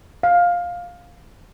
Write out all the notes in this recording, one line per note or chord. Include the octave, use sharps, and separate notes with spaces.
F5